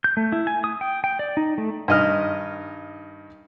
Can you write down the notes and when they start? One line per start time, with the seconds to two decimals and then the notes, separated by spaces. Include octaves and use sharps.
0.04 G6
0.17 A3
0.32 E4
0.47 G#5
0.64 D#6
0.81 G5
1.04 G5
1.19 D5
1.37 D#4
1.58 A3
1.88 G2 D#3 D#5 D#6 F6